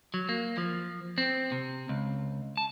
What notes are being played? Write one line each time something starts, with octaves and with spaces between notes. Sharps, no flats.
F#3
A#3
F3
C4
C3
C#2
A5